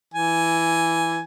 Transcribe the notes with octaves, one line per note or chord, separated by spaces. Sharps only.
E3 G#5